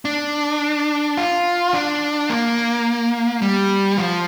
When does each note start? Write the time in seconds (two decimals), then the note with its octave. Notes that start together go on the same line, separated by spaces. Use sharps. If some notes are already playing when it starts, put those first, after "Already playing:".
0.05 D4
1.17 F4
1.74 D4
2.29 A#3
3.42 G3
3.98 F3